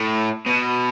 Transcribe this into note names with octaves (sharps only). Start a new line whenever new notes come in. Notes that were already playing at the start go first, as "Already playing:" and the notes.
Already playing: A2
B2